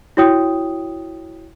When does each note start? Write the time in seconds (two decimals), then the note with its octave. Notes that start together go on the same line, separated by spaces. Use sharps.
0.17 E4 F#4 C#5 G5 D#6